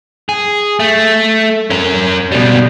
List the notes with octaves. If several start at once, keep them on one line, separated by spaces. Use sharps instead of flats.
G#4
A3
C#4 A#4
B2 G3